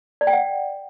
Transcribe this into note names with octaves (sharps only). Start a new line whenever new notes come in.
D5
G5
F#5